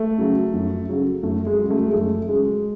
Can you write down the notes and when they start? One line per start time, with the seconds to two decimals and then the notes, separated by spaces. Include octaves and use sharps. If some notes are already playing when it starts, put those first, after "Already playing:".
Already playing: A3
0.18 C#3 F#3
0.54 F#2
0.89 C#3 F#3
1.23 F#2 A3
1.46 G#3
1.59 C#3 F#3
1.70 A3
1.86 G#3
1.93 F#2 A3
2.28 C#3 F#3 G#3